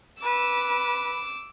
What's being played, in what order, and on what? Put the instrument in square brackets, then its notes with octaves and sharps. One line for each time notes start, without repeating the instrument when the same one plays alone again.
[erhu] B4 [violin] D6 E6